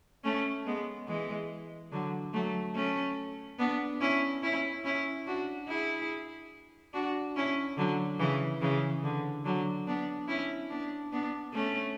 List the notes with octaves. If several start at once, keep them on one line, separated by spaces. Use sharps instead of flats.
A3 C#4
G#3 B3
E3 G#3
D3 F#3
F#3 A3
A3 C#4
B3 D4
C#4 E4
C#4 E4
C#4 E4
D4 F#4
E4 G#4
D4 F#4
C#4 E4
D3 F#3
C#3 E3
C#3 E3
D3
D3 F#3
B3 D4
C#4 E4
B3 D4
B3 D4
A3 C#4